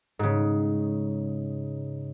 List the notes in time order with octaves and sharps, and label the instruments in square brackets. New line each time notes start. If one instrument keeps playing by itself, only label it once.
[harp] G#2 C#3